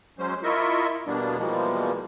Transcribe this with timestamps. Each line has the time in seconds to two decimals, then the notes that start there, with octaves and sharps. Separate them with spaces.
0.19 F#3 G#3 C#4 C5
0.43 E4 F4 A#4 D#5 E5 C#6
1.07 E2 B2 G3 A#3 B3 D4
1.38 B2 E3 F3 G3 G#3 A#3